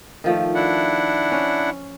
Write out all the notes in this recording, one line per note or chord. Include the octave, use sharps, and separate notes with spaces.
D#3 F3 A3
D4 E4 F#5
C#4